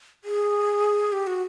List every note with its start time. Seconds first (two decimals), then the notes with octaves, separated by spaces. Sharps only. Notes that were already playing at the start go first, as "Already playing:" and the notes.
0.24 G#4
1.13 G4
1.27 F#4